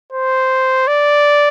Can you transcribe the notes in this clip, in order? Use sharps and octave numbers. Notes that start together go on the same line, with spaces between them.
C5
D5